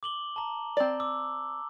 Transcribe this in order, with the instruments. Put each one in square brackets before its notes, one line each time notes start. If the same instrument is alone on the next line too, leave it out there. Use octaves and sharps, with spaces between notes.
[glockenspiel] D6 F#7 G7
A5 A#5
[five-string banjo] C4 D5
[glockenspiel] D6 E6